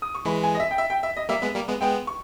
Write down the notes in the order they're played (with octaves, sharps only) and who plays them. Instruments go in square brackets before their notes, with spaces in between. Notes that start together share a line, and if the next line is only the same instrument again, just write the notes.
[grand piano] D#6
C#6
[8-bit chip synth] E3 G#3 [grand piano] B5
[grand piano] G#5
D#5
E5
G5
E5
G5
E5
D#5
[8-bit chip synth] G3 A#3 [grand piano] E5
[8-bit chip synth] G#3 B3
G3 A#3
G#3 B3
[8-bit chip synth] G#3 B3 [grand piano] G5
[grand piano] C#6